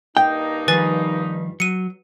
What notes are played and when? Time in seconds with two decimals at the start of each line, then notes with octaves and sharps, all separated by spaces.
0.17 G2 A#3 D#4 G5
0.68 D#3 F3 G3 B4 G#5 A6
1.60 F#3 C#7 D#7